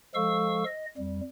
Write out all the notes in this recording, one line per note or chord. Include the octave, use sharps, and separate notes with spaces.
F3 G#3 A4 F5 C#6 E6
D#5
F2 G3